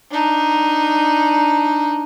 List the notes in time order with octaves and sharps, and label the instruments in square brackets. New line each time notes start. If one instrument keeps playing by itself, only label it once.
[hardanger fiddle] D4 D#4